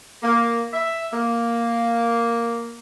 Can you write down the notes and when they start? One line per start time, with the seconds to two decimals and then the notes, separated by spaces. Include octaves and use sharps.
0.23 A#3
0.73 E5
1.13 A#3